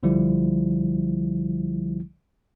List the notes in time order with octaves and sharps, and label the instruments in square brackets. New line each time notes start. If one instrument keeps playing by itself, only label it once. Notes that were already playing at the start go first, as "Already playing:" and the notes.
[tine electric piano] C2 D3 F3 G3 E4